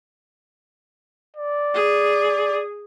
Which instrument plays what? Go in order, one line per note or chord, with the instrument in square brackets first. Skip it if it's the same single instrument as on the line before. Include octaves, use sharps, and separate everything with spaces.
[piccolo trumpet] D5
[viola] G#4